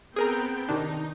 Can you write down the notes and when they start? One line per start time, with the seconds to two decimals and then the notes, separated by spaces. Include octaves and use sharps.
0.16 B3 C4 G#4 A#4 G5 A#5
0.69 C3 D#3 D4 D#4